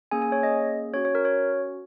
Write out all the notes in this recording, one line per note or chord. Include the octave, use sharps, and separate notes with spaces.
A#3 C#4 G#4 G#5
G#5
C#5
D#5
C#4 F#4 C#5
C#5
A#4
C#5